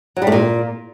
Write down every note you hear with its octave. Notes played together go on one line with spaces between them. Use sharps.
F#3
G3
A2
A#2